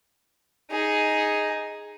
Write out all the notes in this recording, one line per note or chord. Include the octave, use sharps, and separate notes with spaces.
D#4 G#4